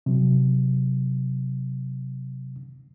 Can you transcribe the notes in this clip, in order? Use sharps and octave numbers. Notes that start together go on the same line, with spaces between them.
C3 F#3